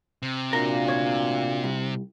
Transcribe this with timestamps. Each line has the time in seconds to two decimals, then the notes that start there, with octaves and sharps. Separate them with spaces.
0.22 C3
0.53 A#2 D4 F#4 A#4 F5
0.88 D2 C#5
1.64 C2